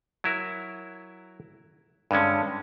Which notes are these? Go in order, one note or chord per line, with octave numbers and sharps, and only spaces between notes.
F#3 E4 A#4
G2 D3 G#3 C#4